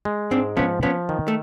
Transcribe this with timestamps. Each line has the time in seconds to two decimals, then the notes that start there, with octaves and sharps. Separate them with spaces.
0.05 G#3
0.31 G#2 C4 D4
0.57 F3 B3 C#4
0.83 F3 B3 C#4
1.09 D#3
1.28 A3